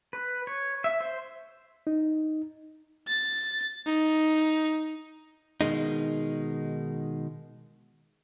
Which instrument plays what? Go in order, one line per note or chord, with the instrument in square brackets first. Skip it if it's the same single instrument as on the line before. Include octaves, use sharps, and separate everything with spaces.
[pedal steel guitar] B4
C#5
E5
C5
[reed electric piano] D#4
[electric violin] A6
D#4
[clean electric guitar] B2 D#3 G#3 D#4